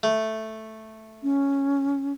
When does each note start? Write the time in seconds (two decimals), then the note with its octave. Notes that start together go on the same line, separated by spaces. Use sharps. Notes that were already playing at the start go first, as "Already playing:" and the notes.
0.03 A3
1.23 C#4